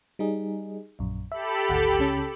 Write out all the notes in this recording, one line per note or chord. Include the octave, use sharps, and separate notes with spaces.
G3 D#4 G#4
A#1 F#2
G4 A4 E5 B5
G#1 D2 F#5
C#2 C#3 C#4